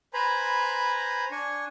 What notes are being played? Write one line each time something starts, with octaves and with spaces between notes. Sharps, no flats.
B4 C5 G#5 A#5 B5
D4 G#5 C#6